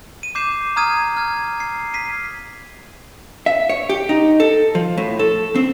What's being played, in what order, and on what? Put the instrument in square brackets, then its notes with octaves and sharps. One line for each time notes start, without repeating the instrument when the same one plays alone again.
[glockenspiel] D#7
D6 G6 C7 E7
A#5 D#6 F6 G#6 D#7
F6 G#6
C7
B6 C7 D#7
[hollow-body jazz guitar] E5
C#5
G4
D#4
A4
F3
A2
A4
C4